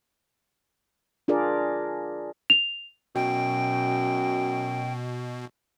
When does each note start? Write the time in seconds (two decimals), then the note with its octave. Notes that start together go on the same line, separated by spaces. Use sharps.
1.28 D4 F4 G#4 A#4 D5
2.50 F7
3.15 F#2 B2 G5